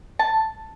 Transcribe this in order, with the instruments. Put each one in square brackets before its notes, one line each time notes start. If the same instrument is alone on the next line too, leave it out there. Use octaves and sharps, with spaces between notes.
[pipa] A5